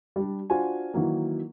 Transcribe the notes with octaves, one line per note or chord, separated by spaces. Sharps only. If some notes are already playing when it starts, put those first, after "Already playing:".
G3 D4
D4 F4 F#4 C5 G#5
D#3 E3 F#3 A#3